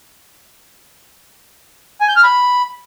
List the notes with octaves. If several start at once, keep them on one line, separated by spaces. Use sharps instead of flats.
G#5
G6
F6
B5